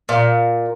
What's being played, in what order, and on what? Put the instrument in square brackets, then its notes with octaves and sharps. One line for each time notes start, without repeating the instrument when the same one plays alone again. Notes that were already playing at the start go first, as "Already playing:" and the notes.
[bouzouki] A#2